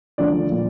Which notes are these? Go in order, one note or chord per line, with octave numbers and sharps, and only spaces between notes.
D2 D3 F3 D5
A#2 F3